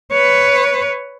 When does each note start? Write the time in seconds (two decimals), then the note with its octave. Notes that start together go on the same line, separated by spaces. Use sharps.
0.12 B4 C#5